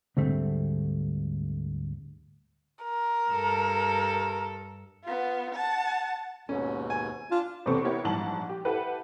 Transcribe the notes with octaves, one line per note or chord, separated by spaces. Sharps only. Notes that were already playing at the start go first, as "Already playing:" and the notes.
D2 G#2 D3 G3 A3 C4
A#4
G2 A4
B3 F4
F#5 A5
D#2 G#2 B2 C#4
G#5
D4 F4 A5
E2 C3 B3 C4 A4 C#6
B3 E4 G4 A#4 C#5
A#1 G#2 E3 G3 A5 F#7
G4
E4 G4 A4 B4 F#5